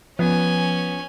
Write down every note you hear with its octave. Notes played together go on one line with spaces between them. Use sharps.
F3 B3 C#4 G#5